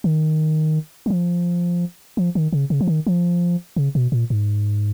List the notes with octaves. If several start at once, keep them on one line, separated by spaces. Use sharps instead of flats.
D#3
F#3
F3
F3
D#3
C#3
C#3
F3
D#3
F3
C#3
B2
A#2
G#2